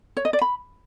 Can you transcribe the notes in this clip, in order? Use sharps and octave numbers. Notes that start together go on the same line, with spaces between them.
C#5
D#5
D5
B5